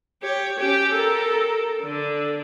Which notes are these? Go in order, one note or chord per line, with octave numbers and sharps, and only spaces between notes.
G4 C#5
C#4 G4
A4 A#4
D3 D4